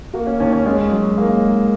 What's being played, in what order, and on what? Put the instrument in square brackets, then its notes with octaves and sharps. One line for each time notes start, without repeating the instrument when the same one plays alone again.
[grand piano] A#3 [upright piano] F#4
[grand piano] C#4
[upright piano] D#2 [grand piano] C#4
[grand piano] C#4
[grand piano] G#3 [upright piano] C#4
[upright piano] F#3
[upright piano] G#2 [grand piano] A#3
[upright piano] G#2